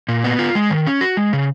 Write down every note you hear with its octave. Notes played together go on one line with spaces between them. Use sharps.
A#2
B3
F4
G#3
D#3
C#4
F#4
G#3
C#3